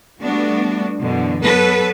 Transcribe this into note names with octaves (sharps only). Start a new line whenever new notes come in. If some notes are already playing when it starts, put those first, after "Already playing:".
G3 A3 B3 D4 F#4
F#2 B2 D3 E3
F#3 B3 A4 B4